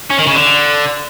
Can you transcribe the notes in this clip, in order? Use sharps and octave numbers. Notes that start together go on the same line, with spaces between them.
C#4
D#3
C#3
D3